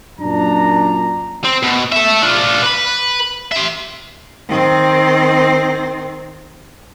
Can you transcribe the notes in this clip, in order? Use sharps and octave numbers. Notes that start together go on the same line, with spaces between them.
F#2 A#2 D4 A#5
C4
B2
A4 E5
D4 F4
B4 B5
E5 C6
D#3 C4